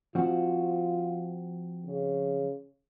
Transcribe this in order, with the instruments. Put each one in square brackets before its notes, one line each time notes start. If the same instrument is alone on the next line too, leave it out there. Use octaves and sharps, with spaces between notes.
[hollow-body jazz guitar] F3 C4 F#4 [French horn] F4
[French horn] C#3